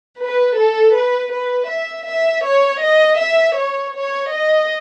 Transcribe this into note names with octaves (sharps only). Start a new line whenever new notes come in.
B4
A4
B4
B4
E5
E5
C#5
D#5
E5
C#5
C#5
D#5